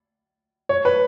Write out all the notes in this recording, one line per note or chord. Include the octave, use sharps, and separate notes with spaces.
C#5
B4